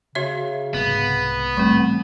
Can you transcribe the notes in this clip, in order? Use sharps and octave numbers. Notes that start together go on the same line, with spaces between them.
C#3 F#4 C#5 E5
C2 G#2 B3
A2 C#3 E3 G3 C4